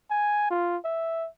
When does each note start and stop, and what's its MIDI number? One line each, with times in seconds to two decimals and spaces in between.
0.10 0.49 80
0.50 0.77 65
0.84 1.28 76